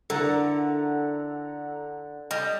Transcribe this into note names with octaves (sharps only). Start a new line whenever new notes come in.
D3 D4 E4 A4 A#4 F#5 A#5
G3 D#5